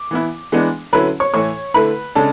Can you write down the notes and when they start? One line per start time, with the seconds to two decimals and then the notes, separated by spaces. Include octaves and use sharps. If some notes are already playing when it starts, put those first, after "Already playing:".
Already playing: D6
0.11 E3 B3 E4
0.52 E3 G#3 B3 D4
0.93 D3 F#3 C#4 E4 B4 B5
1.20 C#5 C#6
1.34 A2 E3 A3 C#5 C#6
1.74 D3 A3 E4 B4 B5
2.15 C#3 G#3 D4 A4 A5